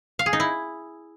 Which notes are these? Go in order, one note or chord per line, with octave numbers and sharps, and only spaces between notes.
F5
G#4
D#4
E4